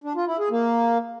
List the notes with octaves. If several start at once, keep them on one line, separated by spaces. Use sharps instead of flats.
D4
F4
E4
G#4
A#3